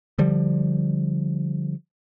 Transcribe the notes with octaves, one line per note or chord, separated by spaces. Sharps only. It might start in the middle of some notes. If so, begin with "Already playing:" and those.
D3 F3 G3